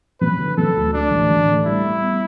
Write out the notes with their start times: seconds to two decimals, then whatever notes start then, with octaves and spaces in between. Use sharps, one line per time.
0.21 F#3 B4
0.39 D3
0.57 F#3 A4
0.75 D2
0.93 A3 D4
1.11 A1
1.30 A1
1.48 A3
1.66 G3 E4
1.84 G3
2.02 B3